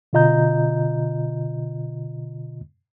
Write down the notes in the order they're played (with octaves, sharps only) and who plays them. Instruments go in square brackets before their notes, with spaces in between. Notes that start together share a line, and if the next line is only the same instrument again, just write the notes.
[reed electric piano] B2 D3 F4 D#5 A#5 G6